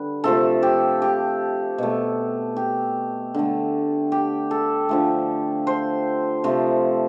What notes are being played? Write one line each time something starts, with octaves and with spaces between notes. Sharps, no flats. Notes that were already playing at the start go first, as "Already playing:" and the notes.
Already playing: D3 G3 B4
C3 F3 A3 A4
G4
G4
B2 A3
G4
D3 A3
G4
A4
D3 F3 A3
C5
C3 F3 A3